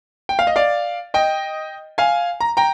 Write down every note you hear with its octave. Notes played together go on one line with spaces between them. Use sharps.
G5
F5
D#5
D5 F5
D#5 G5
F5 G#5
A#5
G5 A#5